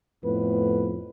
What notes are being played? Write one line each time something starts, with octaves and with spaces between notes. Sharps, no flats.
F2 A2 B3 B4